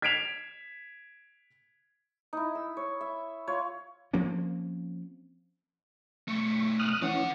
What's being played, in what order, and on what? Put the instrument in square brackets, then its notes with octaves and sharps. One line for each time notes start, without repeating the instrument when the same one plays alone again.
[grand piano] G#6 B6 C7 D7 E7 F7
[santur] D#4 E4
E6
C#5
E5
F4 C#5 F5
[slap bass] F3 A#3 C4 C#4
[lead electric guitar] B1 A3 [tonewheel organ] C#6
[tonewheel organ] D#6 F6 F#6
[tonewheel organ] E3 C#4 [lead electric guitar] D4 F#5